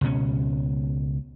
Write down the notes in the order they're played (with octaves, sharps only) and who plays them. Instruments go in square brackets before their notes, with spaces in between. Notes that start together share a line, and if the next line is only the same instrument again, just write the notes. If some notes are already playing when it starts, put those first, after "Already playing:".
[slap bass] C#2 B2 C#4